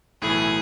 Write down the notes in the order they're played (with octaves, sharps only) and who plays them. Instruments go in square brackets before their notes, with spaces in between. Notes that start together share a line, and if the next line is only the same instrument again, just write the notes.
[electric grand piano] B1 A2 E3 A3 E4 [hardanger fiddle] G#4